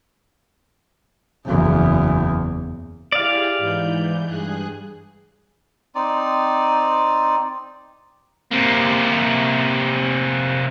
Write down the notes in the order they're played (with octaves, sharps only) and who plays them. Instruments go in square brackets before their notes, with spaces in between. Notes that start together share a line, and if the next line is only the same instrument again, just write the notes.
[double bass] F#1 E2
[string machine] E4 G4 G#4 [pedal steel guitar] D5 F5
[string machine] G#2 E3 G6
G2 G#4 F#6
[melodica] C4 D#4 D5
[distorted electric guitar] C3 A#3